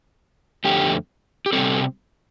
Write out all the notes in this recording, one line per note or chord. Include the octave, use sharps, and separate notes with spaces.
F2 D3 A3 G4
G4
C3 G3 C4 A4